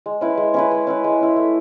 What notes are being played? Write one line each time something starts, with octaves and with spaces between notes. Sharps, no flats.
G#3
C#4 E4 B4
G#3
C#4 E4 B4
G#3
C#4 E4 B4
G#3
C#4 E4 B4
A3